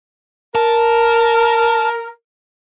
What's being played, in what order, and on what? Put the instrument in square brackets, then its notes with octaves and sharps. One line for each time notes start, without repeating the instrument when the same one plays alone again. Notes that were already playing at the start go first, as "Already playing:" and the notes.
[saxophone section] A#4 [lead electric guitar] A5